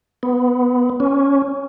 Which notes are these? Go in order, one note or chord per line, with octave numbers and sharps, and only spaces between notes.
B3
C#4